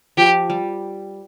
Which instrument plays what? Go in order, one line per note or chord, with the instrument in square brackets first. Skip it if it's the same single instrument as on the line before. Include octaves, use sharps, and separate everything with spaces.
[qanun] F3 [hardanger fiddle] G4
[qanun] G3